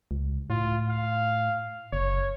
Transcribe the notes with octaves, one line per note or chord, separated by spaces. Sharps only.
C#2
A2 F4
F5
F#1 C#5